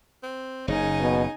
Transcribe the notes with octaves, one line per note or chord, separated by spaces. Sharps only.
C4
F#1 C#3 D#4 G#5
B2